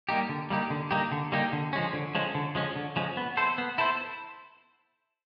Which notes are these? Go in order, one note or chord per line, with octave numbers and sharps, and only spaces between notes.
G3 A#3 D#4 G4
D3
G3 A#3 D#4 G4
D3
G3 A#3 D#4 G4
D3
G3 A#3 D#4 G4
D3
F3 G#3 C#4
D3
F3 G#3 C#4
D3
F3 G#3 C#4
D3
F3 G#3 C#4
B3
E4 A4 C5
B3
E4 A4 C5